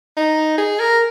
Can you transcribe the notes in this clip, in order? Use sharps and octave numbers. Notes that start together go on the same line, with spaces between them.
D#4
G#4
A#4